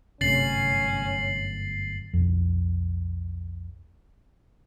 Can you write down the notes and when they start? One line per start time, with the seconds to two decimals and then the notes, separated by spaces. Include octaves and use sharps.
0.21 G1 F#2 C3 A3 C#4 A6 C7 F#7
2.13 B1 F2